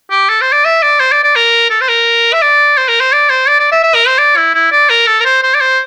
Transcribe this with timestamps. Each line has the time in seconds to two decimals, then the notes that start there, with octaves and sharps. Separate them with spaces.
0.11 G4
0.29 A4
0.41 C5
0.53 D5
0.65 E5
0.83 D5
1.00 C5
1.12 D5
1.24 D5
1.36 A#4
1.70 A4
1.81 C5
1.88 A#4
2.33 E5
2.42 D5
2.78 C5
2.88 A#4
3.00 C5
3.13 D5
3.30 C5
3.48 D5
3.59 D5
3.72 E5
3.84 E5
3.95 A#4
4.07 C5
4.19 D5
4.37 E4
4.54 E4
4.72 D5
4.90 A#4
5.07 A4
5.21 A#4
5.25 C5
5.43 C5
5.55 D5
5.61 C5